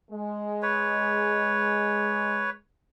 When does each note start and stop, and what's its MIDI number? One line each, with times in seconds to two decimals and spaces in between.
0.11 2.57 56
0.62 2.50 71
0.62 2.50 73